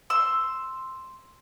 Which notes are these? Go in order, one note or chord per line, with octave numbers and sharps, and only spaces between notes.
C6 E6